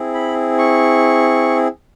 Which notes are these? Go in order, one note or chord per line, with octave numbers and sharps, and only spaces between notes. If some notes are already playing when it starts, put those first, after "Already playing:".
Already playing: C4 E4 G#4
B5
C#6